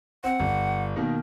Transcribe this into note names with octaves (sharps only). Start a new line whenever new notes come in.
C4 F#5
G1
B2 D#3 A#3